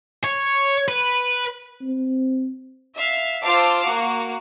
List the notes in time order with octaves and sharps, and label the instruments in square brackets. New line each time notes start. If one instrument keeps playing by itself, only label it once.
[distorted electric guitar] C#5
B4
[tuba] C4
[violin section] E5 F5
F4 C5 F5 A5 D6 E6
A#3 F#4